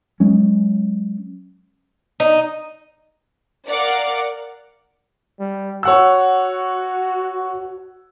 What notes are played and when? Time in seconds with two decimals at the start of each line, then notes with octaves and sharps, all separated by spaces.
0.20 F#3 G#3 C#4
2.20 D#4
3.67 A#4 D5 F5 F#5 D6
5.39 G3
5.83 F#4 C#5 F#5 E6